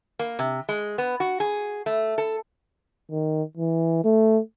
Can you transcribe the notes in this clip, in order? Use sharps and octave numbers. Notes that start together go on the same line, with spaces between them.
A#3
C3
G#3
B3
F#4
G#4
A3
A4
D#3
E3
A3